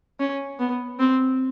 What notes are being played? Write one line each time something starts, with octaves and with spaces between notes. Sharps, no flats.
C#4
B3
C4